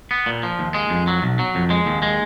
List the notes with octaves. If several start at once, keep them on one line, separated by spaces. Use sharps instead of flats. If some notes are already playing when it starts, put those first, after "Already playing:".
B3
A#2
F3
D#2
G#3
F2
F#3
B1
F#3
F2
G#3
D#2
G#3